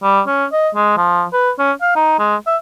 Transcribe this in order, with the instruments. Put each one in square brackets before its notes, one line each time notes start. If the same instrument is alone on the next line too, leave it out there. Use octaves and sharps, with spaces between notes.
[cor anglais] G3
C#4
D#5
G#3
F3
B4
C#4
F5
D#4
G#3
E5